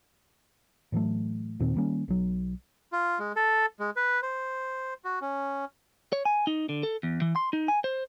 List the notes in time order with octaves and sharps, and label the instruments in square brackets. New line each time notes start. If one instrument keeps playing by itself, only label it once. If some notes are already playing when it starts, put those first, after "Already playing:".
[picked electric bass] A2 E3 F#3 A3
D#2 A#2 D#3 C4
D#3 G3 A#3 C#4
B1 F#3
[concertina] F4
G#3
A4
G#3
B4
C5
F#4
C#4
[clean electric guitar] C#5
G#5
D#4
D3
A4
E2
E3
C6
D#4
G#5
C5